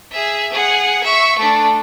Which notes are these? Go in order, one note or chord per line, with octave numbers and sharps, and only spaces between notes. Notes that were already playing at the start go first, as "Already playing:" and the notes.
G#4 E5
G#4 F#5
E5 C#6
A3 D4